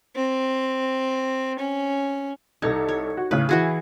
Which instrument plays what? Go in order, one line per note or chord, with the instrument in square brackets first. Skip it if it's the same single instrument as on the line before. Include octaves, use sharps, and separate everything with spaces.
[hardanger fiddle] C4
C#4
[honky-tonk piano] C2 A4 G#6 [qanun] D#4
[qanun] C#5
[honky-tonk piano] F#4
[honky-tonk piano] A2 C#3 [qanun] B4
[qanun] E3 F#4 G#4 [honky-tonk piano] E4